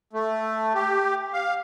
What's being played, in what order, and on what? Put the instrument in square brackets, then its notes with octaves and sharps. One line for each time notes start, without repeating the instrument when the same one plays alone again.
[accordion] A3
G4
F5